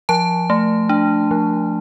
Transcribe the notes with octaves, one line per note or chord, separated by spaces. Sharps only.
F3 A5
A3
D4
F3